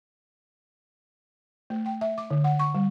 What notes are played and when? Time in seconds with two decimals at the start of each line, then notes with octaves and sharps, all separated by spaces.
1.70 A3
1.86 G5
2.01 E5
2.18 D6
2.30 D3
2.44 F#5
2.60 C#6
2.75 G3